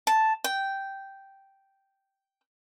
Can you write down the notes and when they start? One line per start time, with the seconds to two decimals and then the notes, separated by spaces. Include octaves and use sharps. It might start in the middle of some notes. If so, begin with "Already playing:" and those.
0.07 A5
0.44 G5